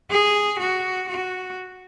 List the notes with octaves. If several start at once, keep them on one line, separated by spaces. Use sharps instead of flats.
G#4
F#4
F#4